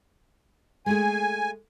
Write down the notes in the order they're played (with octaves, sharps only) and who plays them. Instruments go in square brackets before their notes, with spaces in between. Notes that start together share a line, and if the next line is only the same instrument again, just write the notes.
[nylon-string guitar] G#3 A3 G#4 [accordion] G#5